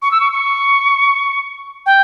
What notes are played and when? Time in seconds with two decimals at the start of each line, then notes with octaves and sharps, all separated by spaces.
0.02 C#6
0.11 E6
0.20 C#6
0.32 C#6
1.86 G5